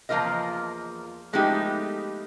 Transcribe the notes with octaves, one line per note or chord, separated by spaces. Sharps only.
E2 F3 A#3 F4 A#4 D#5
F3 G#3 A3 B3 D#4 G4